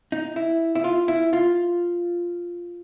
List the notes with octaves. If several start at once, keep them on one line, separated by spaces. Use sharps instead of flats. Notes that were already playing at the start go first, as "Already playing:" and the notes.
D#4
E4
E4
F4
E4
F4